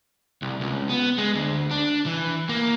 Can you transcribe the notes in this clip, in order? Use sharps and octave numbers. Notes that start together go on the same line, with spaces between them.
C2
C#2
B3
G#3
D2
D4
E3
A#3